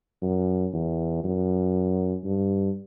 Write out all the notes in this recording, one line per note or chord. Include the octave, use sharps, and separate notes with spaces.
F#2
E2
F#2
G2